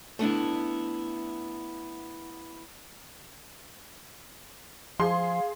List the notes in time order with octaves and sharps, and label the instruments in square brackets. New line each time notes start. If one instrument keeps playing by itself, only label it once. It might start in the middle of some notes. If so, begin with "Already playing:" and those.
[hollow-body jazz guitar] A3 B3 D4 E4
[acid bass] F3 [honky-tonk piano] G#4 C6 [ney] F5